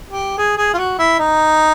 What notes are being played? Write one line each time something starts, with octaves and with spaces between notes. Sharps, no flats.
G4
G#4
G#4
F4
F#4
E4
D#4